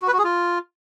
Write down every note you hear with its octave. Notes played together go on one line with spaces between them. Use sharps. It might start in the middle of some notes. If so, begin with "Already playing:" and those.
F#4
B4
F#4
G#4
F4